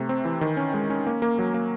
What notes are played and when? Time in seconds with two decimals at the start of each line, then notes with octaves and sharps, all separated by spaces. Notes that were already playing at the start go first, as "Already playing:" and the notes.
Already playing: C3 A3
0.09 C4
0.25 E3
0.41 D#3
0.57 C#4
0.74 G#3
0.90 C#4
1.07 A#3
1.22 A#3
1.39 F#3
1.54 A#3